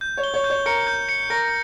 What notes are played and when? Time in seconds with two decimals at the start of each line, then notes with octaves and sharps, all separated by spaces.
0.01 G6
0.17 C#5
0.23 G7
0.34 C#5
0.44 G6
0.50 C#5
0.66 A#4 C#7
0.87 G6
1.09 C#7
1.30 A#4 A#6